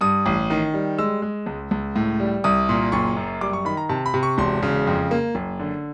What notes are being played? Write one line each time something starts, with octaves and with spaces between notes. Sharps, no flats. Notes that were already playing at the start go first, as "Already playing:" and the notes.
G2 D#6
A1
D#3
G3
G#3 E6
G#3
C#2
C#2
A2
G3
C2 D#6
A#2
F#1 C#6
F#2
G3 D6
C#6
D#3 B5
A#5
C3 A5
B5
C3
C#6
E1 C6
C#3
F2
A#3
F#1
D3